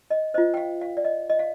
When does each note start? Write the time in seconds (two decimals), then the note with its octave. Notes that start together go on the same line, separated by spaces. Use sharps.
0.10 D#5
0.34 C5 D#5
0.38 F4
0.54 G5
0.57 F5
0.81 F5
0.97 D5
1.04 D#5
1.30 D#5
1.39 F5